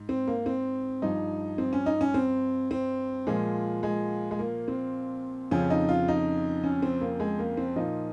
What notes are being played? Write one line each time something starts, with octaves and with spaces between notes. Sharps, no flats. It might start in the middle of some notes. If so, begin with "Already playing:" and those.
Already playing: G#2
C4
A#3
C4
G2 F3 D#4
C4
C#4
D#4
C#4
C4
C4
A#2 F3 G#3
G#3
G#3
A#3
C4
F2 C#3 F3 C#4
D#4
F4
D#4
C#4
C4
A#3
G#3
A#3
C4
A#2 F3 D#4